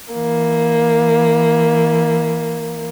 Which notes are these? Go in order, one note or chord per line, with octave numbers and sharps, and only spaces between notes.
E3 A#3